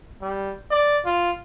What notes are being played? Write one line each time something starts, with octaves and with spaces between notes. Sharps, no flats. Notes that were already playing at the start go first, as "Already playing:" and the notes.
G3
D5
F4